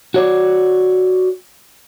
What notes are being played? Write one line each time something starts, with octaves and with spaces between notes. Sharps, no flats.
F#4 C#5 D5